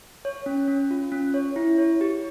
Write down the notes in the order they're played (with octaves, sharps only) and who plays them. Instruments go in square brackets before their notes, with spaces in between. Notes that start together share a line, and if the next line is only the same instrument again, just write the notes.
[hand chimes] C#5
C#4
C#4
F4
C#4
C#5
E4
C#5
G4